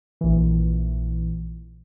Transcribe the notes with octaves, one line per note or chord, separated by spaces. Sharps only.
A#1 E3